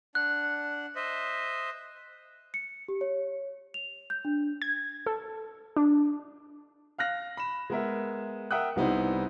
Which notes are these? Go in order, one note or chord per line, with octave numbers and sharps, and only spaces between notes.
D4 F#5 F#6
C5 D#5 E5
C#7
G4
C#5
F7
G6
D4
G#6
A4
D4
F5 F6 F#6 A#6
B5 E7
G#3 B3 A#4 E5
A#4 E5 F#5 G5 D#6 F#6
C2 G3 B3 D#4 E4 C5